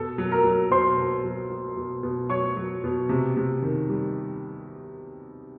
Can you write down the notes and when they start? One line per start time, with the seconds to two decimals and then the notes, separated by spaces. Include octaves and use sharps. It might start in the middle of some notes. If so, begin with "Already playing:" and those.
Already playing: B2 A4
0.18 F#3
0.32 A#4 A#5
0.44 F#3
0.71 B2 C5 C6
0.98 B2
1.24 F#3
1.50 F#3
1.77 B2
2.03 B2
2.30 F#3 C#5 C#6
2.57 F#3
2.84 B2
3.09 C3
3.37 C3
3.62 D#3
3.89 G3